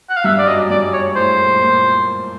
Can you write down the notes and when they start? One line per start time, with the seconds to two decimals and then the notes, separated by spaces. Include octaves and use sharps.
0.10 F#5
0.17 F5
0.24 G2 G3 E5
0.39 D5
0.47 F#2 F#3 D#5
0.70 G2 G3 D5
0.93 C#5
1.05 G#3
1.16 A2 A3 C5
1.39 A#2 A#3
1.61 A#2 A#3